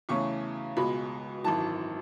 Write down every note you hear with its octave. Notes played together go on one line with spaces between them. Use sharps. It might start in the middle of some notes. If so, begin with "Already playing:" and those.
E2 C#3 E3 A3 C#4 C#6
C#2 B2 G#3 B5
G#1 F#2 E3 A5